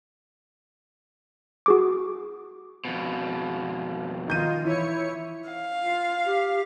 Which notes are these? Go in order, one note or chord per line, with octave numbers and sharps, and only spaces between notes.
F#4 G#4 D6
F2 B2
D#3 D#4 F4 G6 D#7
E3 E4 C#5 C#7
F5
F4
G4